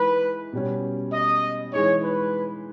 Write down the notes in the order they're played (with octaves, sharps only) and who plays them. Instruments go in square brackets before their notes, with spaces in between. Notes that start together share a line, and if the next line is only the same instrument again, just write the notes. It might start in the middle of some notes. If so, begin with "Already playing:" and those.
Already playing: [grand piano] E3 G#3 D#4 [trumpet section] B4
[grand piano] B2 G3 C#4
[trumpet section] D#5
[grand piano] E3 G#3 D#4 [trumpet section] C#5
[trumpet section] B4